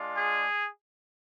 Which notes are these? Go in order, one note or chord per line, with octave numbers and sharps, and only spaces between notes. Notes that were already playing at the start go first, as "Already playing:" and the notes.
Already playing: G#3 D4 F4
G#4